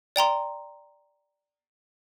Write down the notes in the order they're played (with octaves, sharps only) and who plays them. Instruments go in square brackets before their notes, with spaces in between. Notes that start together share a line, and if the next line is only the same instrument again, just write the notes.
[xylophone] D5 G5 A#5 C6